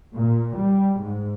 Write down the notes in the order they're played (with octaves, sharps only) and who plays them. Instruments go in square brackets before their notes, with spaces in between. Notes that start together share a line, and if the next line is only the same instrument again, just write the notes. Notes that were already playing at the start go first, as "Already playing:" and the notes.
[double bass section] A#2
G3
G#2